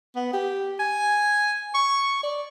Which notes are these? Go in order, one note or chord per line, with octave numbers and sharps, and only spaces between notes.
B3
G4
G#5
C#6
D5